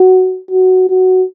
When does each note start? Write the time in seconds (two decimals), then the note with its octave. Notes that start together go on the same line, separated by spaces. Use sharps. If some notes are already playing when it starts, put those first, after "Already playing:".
Already playing: F#4
0.51 F#4
0.90 F#4